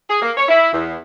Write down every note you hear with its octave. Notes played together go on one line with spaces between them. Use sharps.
G#4
A#3
C#5
E4
E2